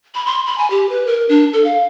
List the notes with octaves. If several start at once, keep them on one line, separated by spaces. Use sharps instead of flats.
B5
C6
B5
G#5
G4
B4
A#4
D4
A4
F5